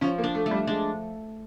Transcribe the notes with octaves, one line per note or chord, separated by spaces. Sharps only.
F3 C#4
A#3
D4
A3
A3
G3
G#3 D4